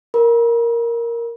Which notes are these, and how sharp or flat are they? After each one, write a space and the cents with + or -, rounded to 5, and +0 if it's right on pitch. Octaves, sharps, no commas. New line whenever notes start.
A#4 +0 B5 -45